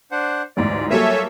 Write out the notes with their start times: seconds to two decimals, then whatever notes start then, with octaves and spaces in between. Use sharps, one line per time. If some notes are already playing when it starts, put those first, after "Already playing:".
0.11 D4 C5 F#5
0.57 A1 D2 G#2 D5
0.91 F#3 G3 A#3 A4 C#5 E5 G#5